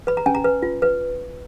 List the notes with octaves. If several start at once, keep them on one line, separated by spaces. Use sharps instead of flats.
B4 B5
A#5
C#4 G#5
A#5
B4
F4
B4